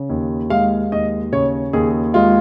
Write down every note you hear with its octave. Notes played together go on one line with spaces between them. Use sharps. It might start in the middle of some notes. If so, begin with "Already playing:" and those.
Already playing: C#3
D#2
G#3 F5
D#2 D#5
C#3 C#5
D#2 G#4
G#3 F4